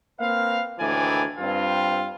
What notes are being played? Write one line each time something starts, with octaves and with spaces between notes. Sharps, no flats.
A#3 C4 B4 F5
D2 A2 D#3 E3 D5 G#5
G2 C4 F4